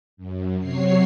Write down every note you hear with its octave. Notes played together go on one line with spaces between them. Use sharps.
F#2
C3 F#3 C#5 C7